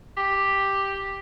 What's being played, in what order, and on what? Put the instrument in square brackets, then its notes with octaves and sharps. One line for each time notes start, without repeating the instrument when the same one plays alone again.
[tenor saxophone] G4